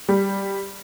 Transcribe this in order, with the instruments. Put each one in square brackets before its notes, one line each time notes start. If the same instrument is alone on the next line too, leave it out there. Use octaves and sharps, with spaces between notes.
[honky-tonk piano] G3